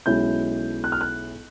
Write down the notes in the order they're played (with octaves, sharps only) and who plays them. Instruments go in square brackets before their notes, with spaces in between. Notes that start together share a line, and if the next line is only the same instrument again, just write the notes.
[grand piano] B1 B2 G#3 C#4 E4 G6
F#6
F6
F#6